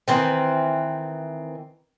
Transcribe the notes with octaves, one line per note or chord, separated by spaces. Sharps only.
D#3 E3 C4